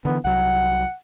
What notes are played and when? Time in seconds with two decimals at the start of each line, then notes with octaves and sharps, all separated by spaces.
0.05 D3 E3 B3
0.24 C2 F#3 F#5